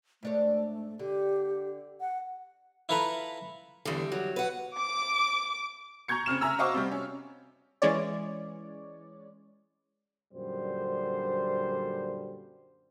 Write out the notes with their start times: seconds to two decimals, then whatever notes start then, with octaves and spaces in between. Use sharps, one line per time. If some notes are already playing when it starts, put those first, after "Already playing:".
0.23 G#2 A3 D4 C#5
0.99 D3 G4
2.01 F#5
2.89 E4 F4 A4 B4 A#5 B5
3.85 E2 D3 G3
4.12 F#3
4.36 B4 F#5
4.78 D6
6.08 A#5 C#6 G6 G#6 C#7
6.26 C#3 C4 F6 E7
6.41 E5 G#5 A#5 E6
6.59 F#4 C5 D#5 F5 C#6 D6
6.74 C3 G3 C4
6.91 C#4
7.82 E3 G#3 C#4 C#5 D5
10.33 F#2 A#2 D3 G3 C5